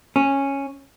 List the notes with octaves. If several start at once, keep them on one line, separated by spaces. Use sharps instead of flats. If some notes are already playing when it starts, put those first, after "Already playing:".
C#4